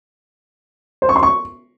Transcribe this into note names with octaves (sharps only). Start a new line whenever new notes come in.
C5
C#6
C6
C#6